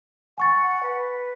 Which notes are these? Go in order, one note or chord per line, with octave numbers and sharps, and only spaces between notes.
F#5 G#5 C#6 A6
B4